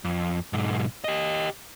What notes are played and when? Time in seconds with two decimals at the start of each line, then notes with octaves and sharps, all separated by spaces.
0.05 F2
0.53 B1 G#2
1.04 G4 D#5